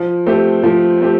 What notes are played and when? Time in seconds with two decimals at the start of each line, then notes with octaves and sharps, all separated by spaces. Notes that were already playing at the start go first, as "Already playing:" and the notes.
Already playing: F3
0.27 A3 C4 G4
0.63 F3
1.01 A3 C4 G4